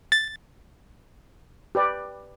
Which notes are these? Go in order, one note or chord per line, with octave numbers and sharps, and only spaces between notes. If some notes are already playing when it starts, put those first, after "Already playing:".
A6
G4 B4 D5